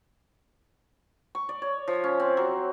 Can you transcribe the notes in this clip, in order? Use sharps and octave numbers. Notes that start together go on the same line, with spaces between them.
C#6
D5
C#5
F3
C#4
C4
F#3